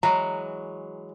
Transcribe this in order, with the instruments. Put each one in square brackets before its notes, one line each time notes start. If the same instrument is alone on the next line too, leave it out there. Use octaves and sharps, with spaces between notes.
[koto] E3 F#3 G#3 [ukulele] A#5